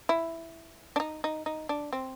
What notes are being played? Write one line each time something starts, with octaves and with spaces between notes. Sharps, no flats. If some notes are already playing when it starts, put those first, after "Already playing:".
E4
D4
D#4
D#4
D#4
D4
C4